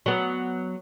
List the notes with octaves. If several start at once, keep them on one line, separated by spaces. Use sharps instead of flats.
F#3 B3